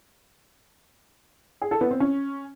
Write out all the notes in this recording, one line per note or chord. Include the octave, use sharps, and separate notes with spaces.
G#4
A4
B3
C4
C#4